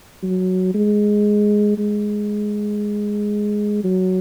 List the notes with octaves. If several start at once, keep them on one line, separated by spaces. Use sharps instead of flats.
F#3
G#3
G#3
F#3